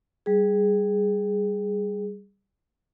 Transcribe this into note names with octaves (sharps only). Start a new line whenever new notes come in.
G3 G#4